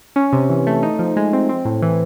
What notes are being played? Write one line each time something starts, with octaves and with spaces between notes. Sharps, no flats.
C#4
C3
E3
A3
D#4
F3
G#3
C4
C4
A2
E3